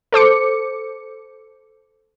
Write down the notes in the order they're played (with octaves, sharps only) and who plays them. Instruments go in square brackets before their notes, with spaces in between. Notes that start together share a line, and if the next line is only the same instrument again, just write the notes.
[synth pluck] A4 C5 D6 C#7